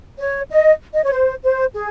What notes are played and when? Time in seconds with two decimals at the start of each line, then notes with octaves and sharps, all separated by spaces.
0.19 C#5
0.50 D#5
0.94 D#5
1.03 C#5
1.12 C5
1.43 C5
1.74 G#4